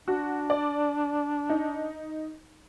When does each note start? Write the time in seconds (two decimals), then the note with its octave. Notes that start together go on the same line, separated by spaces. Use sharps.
0.08 D4 F#4
0.50 D5
1.49 D#4